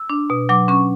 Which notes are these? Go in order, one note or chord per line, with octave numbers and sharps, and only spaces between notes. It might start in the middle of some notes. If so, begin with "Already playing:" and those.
Already playing: E6
D4
B2
F#3 D6
C#4 C#6